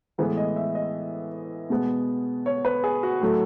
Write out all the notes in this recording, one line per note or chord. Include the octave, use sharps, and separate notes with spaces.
A2 E3 G#3 B3 B4
D#5
E5
D#5
B2 G#3 B3
C#5
B4
G#4
F#4
A2 F#3 A3